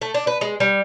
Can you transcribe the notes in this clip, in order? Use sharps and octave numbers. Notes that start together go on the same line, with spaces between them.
A3
D4
B4
G#3
G3